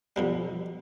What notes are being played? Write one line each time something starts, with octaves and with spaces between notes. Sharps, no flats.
F2 B2 G3